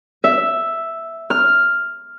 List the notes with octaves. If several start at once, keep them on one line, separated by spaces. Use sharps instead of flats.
E5
F6